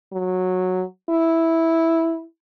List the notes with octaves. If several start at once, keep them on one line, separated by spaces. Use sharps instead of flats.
F#3
E4